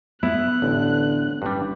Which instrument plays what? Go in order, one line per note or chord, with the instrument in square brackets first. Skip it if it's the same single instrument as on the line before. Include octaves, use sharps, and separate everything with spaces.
[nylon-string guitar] B3 [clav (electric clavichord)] E4 [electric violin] F#6
[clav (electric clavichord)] A1 [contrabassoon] D3
[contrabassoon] F#1 [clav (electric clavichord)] G2 G3